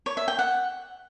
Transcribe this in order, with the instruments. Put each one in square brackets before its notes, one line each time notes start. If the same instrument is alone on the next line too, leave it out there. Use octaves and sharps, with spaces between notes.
[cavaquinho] C#5
E5
G5
F#5